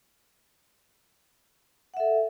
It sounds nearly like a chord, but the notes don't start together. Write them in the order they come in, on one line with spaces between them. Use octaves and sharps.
F#5 E5 A4